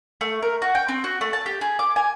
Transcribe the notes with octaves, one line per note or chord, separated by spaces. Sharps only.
A3
A#4
F#4
G5
C4
F#4
A3
A5
G4
G#4
D6
G#5